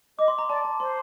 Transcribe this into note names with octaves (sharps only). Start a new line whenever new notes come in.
D#5 D6
C6
A#5
D5 A5
A5
C5 C6